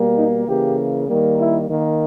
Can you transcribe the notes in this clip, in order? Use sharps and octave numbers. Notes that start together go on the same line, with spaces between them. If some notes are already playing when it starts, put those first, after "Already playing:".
Already playing: B2 G3 A#3
D#4
C#3 E3 A#3 G4
D#3 G3 A#3
E4
D#3 A#3